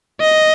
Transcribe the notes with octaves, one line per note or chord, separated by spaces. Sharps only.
D#5